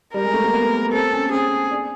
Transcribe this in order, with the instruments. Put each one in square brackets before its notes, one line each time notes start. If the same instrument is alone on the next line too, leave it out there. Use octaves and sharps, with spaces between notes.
[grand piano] G3 [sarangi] A#4
[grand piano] G#3
A3
A#3
B3
[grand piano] C4 [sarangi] A4
[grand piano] C#4
[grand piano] C4 [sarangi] G#4
[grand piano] D4